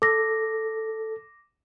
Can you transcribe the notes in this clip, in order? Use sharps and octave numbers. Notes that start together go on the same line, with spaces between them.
A4 D6 A#6